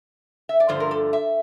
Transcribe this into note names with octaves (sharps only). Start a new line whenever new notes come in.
E5
D5
G2 D3 F3 A3 C5
A#4
A4
E5